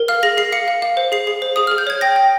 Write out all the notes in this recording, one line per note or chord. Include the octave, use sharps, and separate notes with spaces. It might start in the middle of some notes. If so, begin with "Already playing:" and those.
Already playing: A#4
F5 F6
G#4 A#6
G#4 C7
F5 C#7
F5
F5
C5
G#4 C7
G#4
C5
G#4 D#6
G#4 F6
G6
C#5 G#6
G5 A#6
G5